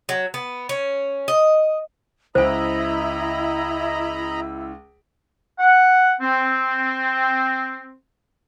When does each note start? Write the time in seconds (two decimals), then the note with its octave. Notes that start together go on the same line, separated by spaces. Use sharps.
0.09 F#3
0.34 B3
0.69 C#4
1.28 D#5
2.35 C#2 E4 C5 D#5 G#5 A#5 B5 E6
5.59 F#5
6.21 C4